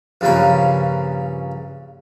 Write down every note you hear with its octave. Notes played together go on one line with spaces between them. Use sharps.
A#1 G2 C#3 A#3 B5